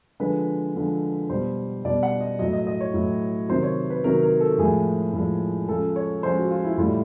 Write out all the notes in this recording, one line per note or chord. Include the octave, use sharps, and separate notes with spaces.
D3 F3 G#3 B4
D3 F3 G#3
B2 G3 C5
B2 G3 D5
F#5
D#5
A2 F#3 D#5
D#5
D#5
C#5
A2 F#3
C3 D#3 F#3 C5
C#5
B4
C3 D#3 F#3 A#4
A#4
A4
A2 F3 G#3 G#4
A2 F3 G#3
C#3 F3 G#3 A4
C#5
C#3 F3 G#3 C5
F#4
F4
E4
A2 E3 G3 F4